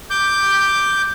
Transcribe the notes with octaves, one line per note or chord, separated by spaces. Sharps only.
D6 G6